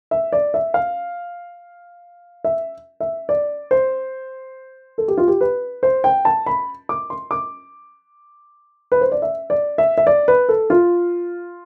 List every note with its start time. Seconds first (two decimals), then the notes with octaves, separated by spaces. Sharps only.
0.11 E5
0.32 D5
0.54 E5
0.74 F5
2.44 E5
3.00 E5
3.29 D5
3.71 C5
4.98 A4
5.08 G4
5.18 F4
5.28 G4
5.41 B4
5.83 C5
6.04 G5
6.25 A5
6.46 B5
6.89 D6
7.10 C6
7.31 D6
8.92 B4
9.01 C5
9.12 D5
9.22 E5
9.50 D5
9.78 E5
9.98 E5
10.07 D5
10.28 B4
10.49 A4
10.70 F4